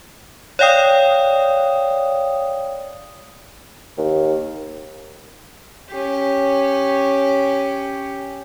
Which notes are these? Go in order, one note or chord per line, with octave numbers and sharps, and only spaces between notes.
C#5 D5 F5 G5 D#6
D#2
C#4 G4